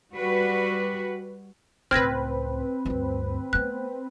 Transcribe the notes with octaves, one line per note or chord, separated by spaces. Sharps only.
G3 F#4 B4
C#2 A2 C4 B4 F6 G#6 A#6
D2 G2
A3 B3 F#6